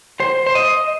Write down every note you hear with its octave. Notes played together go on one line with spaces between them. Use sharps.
C5
C5
D#5